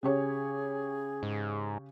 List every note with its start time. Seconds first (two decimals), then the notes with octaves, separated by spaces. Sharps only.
0.03 C#3 G4 G#4 C#5
1.23 G#2